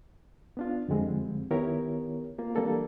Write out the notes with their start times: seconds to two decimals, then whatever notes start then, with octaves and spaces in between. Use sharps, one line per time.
0.57 B3 D4 F4
0.88 F2 D3 G3 G#3 C4
1.50 D#3 B3 E4 G4 A#4 C#5
2.39 A#3 C4 F4
2.55 E3 G3 A#3 D4 A4 A#4